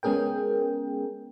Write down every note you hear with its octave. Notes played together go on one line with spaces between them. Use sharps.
G#3 B3 C#4 G#4 A#4 G5